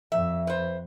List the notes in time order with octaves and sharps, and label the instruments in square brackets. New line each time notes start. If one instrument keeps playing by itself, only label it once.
[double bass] F2 [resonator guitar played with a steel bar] E5
[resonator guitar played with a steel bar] B4 C5